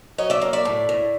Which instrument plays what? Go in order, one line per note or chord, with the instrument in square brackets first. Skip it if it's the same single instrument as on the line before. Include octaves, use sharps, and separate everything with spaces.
[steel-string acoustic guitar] F#3 C#5 D#5
D5 E5
A#3
D5 E5
A2
A2